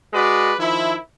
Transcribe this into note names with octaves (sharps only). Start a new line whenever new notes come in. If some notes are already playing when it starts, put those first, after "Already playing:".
G#3 F#4 B4 D5
D#3 F3 E4